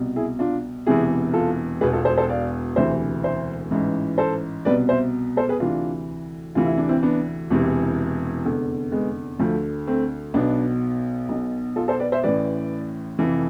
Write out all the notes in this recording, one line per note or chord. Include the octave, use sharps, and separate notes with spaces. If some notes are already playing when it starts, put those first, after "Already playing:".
Already playing: C2 B2
E4 G#4
D4 F4
E1 E2 C3 E3 E4 G#4
F4 A4
E1 E2 B2 G#4 B4
F4 A4
A4 C5
A4 C5
D5 F5
E1 D2 C3 E3 C5 E5
C5 E5
A1 G#2 E3
A4 C5
C2 B2 B4 D5
C5 E5
A4 C5
G#4 B4
D2 C3 E3 D4 F4
D2 C3 E3 F4
E4
D4
C4 E4
B3 D4
E1 E2 C3 E3
F1 E2 D3
G#3 B3
D2 D3 F3 A3
A3 C4
B1 B2 B3 D4
B1 B2
F4 A4
A4 C5
B4 D5
C5 E5
A1 A2 E3 B4 D5
F1 F2 E3